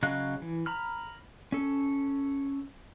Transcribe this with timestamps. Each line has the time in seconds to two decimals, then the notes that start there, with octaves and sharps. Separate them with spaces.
0.03 C#3 F#3 D#5 F5 F#6
0.42 E3
0.66 A#5 B5 F6
1.52 C#4 A4